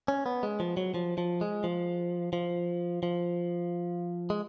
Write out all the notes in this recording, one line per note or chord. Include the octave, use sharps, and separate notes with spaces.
C#4
B3
G#3
F3
F#3
F3
F3
G#3
F3
F3
F3
G#3